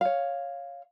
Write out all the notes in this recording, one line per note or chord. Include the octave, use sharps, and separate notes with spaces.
C#5 F5